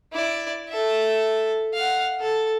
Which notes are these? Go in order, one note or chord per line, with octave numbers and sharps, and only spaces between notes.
E4 D5
A4 E5
F5 F#5
A4